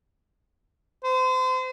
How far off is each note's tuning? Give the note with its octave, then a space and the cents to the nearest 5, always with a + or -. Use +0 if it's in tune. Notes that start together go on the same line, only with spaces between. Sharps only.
C5 -35